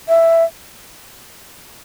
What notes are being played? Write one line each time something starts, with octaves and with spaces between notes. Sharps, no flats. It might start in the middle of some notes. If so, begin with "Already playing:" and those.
E5